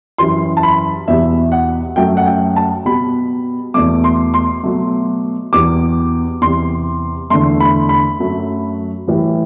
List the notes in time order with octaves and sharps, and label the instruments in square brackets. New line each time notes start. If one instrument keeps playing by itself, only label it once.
[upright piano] F#2 E3 G3 C6
A5
B5
E2 B2 G3 E5
F#5
F#2 F#3 A3 G5
F#5
G5
A5
B2 G3 B5
E2 B2 A3 D6
C6
C6
B2 F#3 A3
E2 B2 G3 D6
E2 C3 G3 C6
E2 D3 A3 C6
B5
B5
F#2 F#3 A3
A2 E3 G3